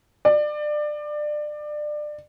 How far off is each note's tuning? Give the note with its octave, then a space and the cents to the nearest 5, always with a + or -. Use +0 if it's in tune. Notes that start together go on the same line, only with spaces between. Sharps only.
D5 +25